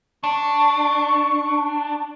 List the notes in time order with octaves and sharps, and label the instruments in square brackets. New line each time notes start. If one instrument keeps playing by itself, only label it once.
[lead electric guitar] D4 [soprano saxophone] C#6